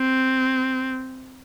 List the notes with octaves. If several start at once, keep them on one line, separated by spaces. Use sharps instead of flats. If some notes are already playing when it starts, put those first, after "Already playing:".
Already playing: C4